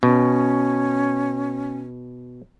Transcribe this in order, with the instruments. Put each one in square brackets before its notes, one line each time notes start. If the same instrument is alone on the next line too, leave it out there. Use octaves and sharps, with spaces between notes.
[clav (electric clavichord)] B2 [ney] C#4